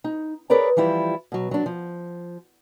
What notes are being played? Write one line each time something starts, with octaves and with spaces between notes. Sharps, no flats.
D#4
G#4 A#4 B4 C#5 D5 A#5
E3 F3 G3 E4 F4
B2 F#3
F#3 D4
F3